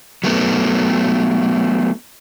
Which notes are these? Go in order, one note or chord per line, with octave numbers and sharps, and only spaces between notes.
F#3 A3 B3